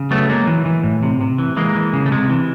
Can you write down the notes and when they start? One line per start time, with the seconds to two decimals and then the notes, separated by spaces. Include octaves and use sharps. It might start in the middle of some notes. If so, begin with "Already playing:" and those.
Already playing: C#3
0.11 F#3 A3 B3
0.29 F#3 G#3 A#3
0.47 E3
0.66 E3
0.83 A2
1.03 C3
1.21 C3
1.38 E3
1.56 E3 G#3 A#3
1.75 E3
1.93 C#3
2.06 A3
2.11 C3 G#3
2.30 E3